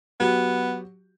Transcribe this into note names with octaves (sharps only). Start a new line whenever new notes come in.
F#3 B3 F#4 G4